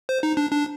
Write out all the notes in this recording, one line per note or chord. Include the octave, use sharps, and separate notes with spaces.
C5
D#4
D4
D4